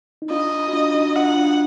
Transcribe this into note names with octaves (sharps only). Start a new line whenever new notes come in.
D#4
D4 F4 D#5
F#4
D4 F4
D#4 F#4
D4 F4 F#5
D4 F4